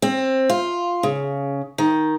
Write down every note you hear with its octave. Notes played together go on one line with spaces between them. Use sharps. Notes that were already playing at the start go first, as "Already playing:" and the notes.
C4
F4
C#3
D#3